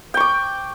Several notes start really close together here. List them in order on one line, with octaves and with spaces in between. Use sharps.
G5 C#6 D6